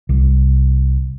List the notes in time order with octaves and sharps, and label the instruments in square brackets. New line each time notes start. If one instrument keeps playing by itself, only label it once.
[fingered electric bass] C2